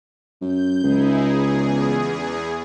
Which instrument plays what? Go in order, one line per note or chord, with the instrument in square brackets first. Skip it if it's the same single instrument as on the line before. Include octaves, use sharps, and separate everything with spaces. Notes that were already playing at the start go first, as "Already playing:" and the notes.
[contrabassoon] F#2 [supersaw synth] G6
[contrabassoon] C#2 [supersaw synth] D#4 E4 G#4
[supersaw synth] E2 G#4